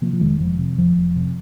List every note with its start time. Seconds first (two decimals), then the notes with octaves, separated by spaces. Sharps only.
0.01 C3 F3 A#3
0.13 F3
0.21 F1 D#3 G#3
0.40 F1 F3
0.59 C3
0.78 F1 F3
0.96 F1
1.16 C3